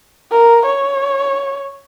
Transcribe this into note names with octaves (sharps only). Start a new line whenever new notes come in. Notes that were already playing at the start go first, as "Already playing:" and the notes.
A#4
C#5